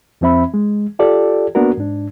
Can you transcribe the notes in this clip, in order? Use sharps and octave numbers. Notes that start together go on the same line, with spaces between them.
F2 F3 C4 E5 B5
G#3
F4 G4 A4 D5
A#3 B3 D4 F#4 A#4
G#2 D4